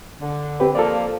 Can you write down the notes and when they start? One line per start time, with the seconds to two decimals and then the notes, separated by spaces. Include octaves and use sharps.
0.21 D3
0.60 C4 G4 B4
0.75 F3 A#3 A4 D5